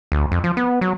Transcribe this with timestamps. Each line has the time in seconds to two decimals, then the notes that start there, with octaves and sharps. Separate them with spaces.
0.12 D2
0.32 F2
0.44 F3
0.57 B3
0.81 F#3